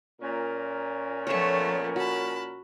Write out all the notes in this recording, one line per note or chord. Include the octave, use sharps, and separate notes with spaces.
A#2 C#4 A#4
F3 A3 B3 C#5 C#6
F#4 A5 B5